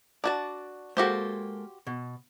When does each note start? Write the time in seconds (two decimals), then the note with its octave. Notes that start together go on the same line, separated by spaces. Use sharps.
0.24 D4 F#4 D5 A5
0.97 G#3 A#3 F#4 G4 A4 C5
1.87 B2